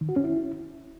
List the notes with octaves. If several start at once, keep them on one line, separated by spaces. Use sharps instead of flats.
D#3
F#4
C#4
E4